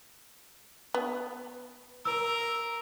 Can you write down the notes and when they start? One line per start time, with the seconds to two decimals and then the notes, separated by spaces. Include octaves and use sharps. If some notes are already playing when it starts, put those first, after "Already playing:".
0.94 B3
2.05 A#4 E6